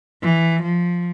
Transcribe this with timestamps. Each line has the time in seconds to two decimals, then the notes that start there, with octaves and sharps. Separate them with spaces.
0.22 E3
0.63 F3